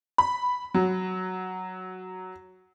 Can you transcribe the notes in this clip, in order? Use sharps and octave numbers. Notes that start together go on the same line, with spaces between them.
B5
F#3